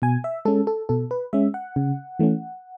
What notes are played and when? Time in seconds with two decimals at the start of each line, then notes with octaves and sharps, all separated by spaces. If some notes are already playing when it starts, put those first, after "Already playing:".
0.02 B2 G#5
0.24 E5
0.45 G#3 C#4 A4
0.67 A4
0.89 B2 A4
1.11 B4
1.33 G#3 C#4 E5
1.54 F#5
1.76 C#3
2.19 E3 A3 C#4